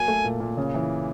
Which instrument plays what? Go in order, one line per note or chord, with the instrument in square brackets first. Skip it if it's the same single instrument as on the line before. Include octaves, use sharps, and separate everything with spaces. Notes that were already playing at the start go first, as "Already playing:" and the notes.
Already playing: [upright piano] F#3 A#3 [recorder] G#5
[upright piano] A3
A#2
A#2
C#3
E3